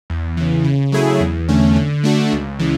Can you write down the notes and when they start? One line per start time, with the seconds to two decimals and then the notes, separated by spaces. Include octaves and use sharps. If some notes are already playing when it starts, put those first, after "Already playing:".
0.10 E2
0.37 C#3 E3
0.64 C#3
0.92 F#3 A3 E4 G#4
1.20 E2
1.48 D3 A3 C#4
1.76 D3
2.04 A3 D4 F#4
2.33 C#2
2.59 C#3 E3